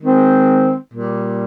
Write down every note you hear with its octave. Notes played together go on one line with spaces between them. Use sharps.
D#3 G#3 C4
A#2 G3